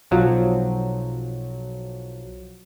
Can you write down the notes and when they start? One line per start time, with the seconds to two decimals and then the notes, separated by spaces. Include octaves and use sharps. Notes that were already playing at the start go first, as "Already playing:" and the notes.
0.11 B1 F3 F#3